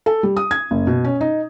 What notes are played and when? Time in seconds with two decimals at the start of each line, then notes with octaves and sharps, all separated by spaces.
0.06 A4
0.23 G3
0.37 D#6
0.51 G#6
0.71 F#1
0.87 B2
1.04 C#4
1.21 D#4